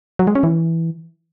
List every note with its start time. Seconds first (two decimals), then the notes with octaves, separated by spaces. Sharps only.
0.19 F#3
0.27 G#3
0.35 C#4
0.43 E3